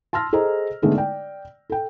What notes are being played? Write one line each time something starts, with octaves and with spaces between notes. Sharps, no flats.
A5 C6 E6 F6 A#6
G#4 A4 C5 D#5 A#5
D3 G#3 A3 B3 D#4
D5 G5
A4 G5